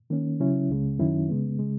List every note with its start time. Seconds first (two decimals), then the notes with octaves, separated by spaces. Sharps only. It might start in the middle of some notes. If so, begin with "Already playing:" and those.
0.10 D#3 A#3 C#4
0.40 C#3 F#3 C#4 E4
0.69 C#2 C#3 G#3
0.99 F#2 D#3 F#3 C#4 E4
1.29 C#3 G#3 B3
1.59 C#3 G#3